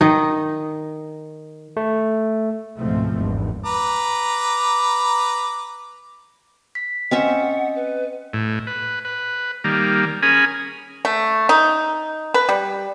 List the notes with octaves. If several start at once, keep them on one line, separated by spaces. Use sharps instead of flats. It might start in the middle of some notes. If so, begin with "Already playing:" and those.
D#3 D#4
A3
C#2 G#2 B2 F3 A3 C4
G#1 E2 G2
B4 A#5 D6
B6
C4 C#4 D#5 E5 F#5
B4
A2
B4
B4
D#3 G3 A#3
C#4 G#4 A#4 G#5 B5
A3
D#4
B4
G3